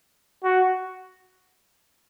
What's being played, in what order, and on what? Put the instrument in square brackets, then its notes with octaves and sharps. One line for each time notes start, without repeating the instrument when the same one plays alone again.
[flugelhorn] F#4